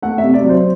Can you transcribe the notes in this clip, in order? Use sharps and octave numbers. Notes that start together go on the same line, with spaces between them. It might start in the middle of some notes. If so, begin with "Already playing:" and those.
A3 F#5
E5
C3
D5
F#3
C5